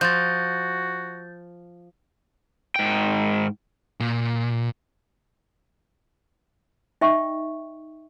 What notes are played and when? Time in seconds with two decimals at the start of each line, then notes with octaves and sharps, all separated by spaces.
0.01 F3 F#4 G6 A6
2.76 G#2 G5
4.00 A#2
7.01 D#4 D#5 E5 G5 C#6